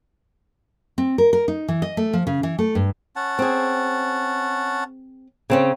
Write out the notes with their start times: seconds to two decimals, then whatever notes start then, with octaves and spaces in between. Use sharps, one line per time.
0.98 C4
1.18 A#4
1.33 A#4
1.48 D#4
1.68 E3
1.82 D#5
1.97 A3
2.13 F3
2.27 C#3
2.43 E3
2.59 A3
2.75 G2
3.16 C#4 F#5 A5
3.39 C4 G#4
5.50 C#3 C4 C#4